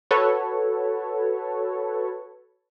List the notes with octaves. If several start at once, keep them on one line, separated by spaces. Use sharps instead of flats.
F#4 A4 B4 C#5